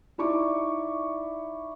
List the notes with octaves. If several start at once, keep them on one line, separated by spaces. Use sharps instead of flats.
D#4 E4 D5 C#6 D6